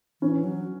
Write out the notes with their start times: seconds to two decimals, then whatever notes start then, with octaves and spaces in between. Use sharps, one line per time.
0.22 E3 C#4
0.44 F#3